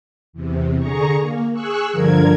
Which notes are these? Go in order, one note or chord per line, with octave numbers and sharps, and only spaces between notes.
E2 C3
D3 G#4 A#5 C#6
A#3
G#4 C#6 E6 F#6
G2 D3 F3 A#4 G#6